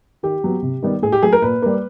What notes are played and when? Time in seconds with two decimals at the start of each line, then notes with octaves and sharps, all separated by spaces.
0.23 D#3 G4
0.44 F#3 B3
0.63 C3
0.82 D#3 G3 B3
1.02 A2 G#4
1.12 G4
1.22 F#3 A3 G#4
1.33 A#4
1.42 A#2 B4
1.62 G3 A#3